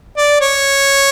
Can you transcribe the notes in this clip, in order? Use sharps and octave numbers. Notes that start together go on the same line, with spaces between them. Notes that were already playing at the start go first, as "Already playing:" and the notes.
D5
C#5